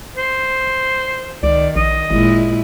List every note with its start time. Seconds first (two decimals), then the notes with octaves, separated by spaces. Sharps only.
0.16 C5
1.43 C#2 D#3 D5
1.76 A#1 D#5
2.10 G#1 A#2 G#3 E4